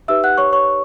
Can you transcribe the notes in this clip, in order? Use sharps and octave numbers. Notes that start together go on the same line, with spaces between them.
D#4 G4 B4 E5 E6
F#5 F#6
C#5 C#6
C#5 C#6